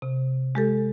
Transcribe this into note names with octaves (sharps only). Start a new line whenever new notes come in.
C3
G#3 G4 A4